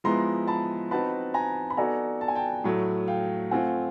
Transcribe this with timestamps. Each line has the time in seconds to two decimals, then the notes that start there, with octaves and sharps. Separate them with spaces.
0.04 F3 G#3 B3 E4 A#5 C6
0.48 A5 B5
0.91 C4 D#4 F#4 B4 A5 B5
1.34 G#5 A#5
1.70 B5
1.77 B3 D#4 F#4 A4 D5 G#5 A#5
2.21 A5
2.28 G#5
2.35 G5 A5
2.64 A2 F#3 A3
3.08 F5 G5
3.51 A3 C4 F4 F#5 G#5